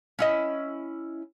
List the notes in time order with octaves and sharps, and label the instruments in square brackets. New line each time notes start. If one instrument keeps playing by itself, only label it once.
[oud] C#4 E4 D#5